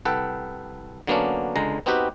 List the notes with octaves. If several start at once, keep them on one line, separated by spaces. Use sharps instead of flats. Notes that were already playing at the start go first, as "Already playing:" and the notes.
C2 A4 B4 F#5 G5
D3 F#3 A#3 B3 C#4 D4
C#2 D3 G#3 A#5
B3 C4 D#4 F#4 G4 B4